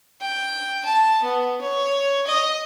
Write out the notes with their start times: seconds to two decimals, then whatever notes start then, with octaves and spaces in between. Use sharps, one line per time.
0.21 G5
0.85 A5
1.23 B3
1.61 C#5
2.26 D#5